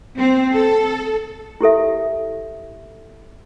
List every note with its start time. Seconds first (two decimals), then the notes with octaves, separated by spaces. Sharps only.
0.18 C4
0.54 A4
1.61 E4 G4 A4 E5